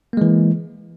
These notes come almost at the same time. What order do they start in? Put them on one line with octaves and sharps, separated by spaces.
A#3 G#3 E3